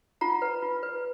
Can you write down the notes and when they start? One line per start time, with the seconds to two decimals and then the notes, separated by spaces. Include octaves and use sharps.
0.21 F4 F#5 A#5
0.42 B4
0.62 F4
0.83 B4